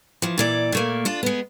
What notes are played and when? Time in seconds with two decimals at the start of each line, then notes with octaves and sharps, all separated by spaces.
0.22 E3 F3
0.38 A#2 E3 D5
0.72 A#2 A3 A#3
1.05 D4 F4
1.23 G#3 B3